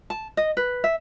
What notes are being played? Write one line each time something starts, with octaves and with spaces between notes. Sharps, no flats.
A5
D#5
B4
E5